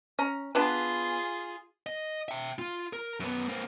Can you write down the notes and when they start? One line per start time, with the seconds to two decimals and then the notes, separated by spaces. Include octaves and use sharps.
0.19 C#4 A#5
0.55 B3 D4 F4 G#4 B4
1.86 D#5
2.28 E5 G5
2.59 F4
2.93 A#4
3.20 F#2 B3
3.48 A#3 C4